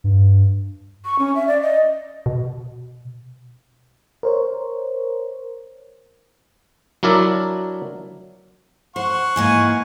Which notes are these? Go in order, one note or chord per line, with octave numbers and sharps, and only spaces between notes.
G2
C#6
C#4
E5
D5
D#5
B2
A#4 C5 C#5
F#3 D4 E4 A#4 D5 E5
C5 F#5 C#6
G#2 E3 A#3 G#5